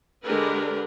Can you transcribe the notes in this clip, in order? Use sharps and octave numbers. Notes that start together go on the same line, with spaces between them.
D3 G#3 D4 G4 A#4 B4